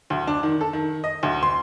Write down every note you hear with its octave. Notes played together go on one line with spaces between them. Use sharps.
D2
D4
D#3
A4
D#3
D#5
D2
C6